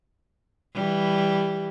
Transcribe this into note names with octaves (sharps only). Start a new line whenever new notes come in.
E3 G3